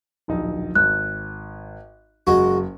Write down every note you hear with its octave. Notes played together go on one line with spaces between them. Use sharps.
D1 A#1 D#4
G#1 F#6
F#1 G#3 F#4